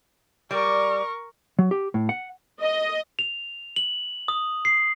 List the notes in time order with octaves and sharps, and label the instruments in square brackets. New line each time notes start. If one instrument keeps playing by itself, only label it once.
[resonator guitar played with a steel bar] G3 D5 [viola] A#4 C#6
[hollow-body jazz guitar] F#3
G4
A2
F#5
[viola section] D#5
[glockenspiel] F7
F#7
D#6
C7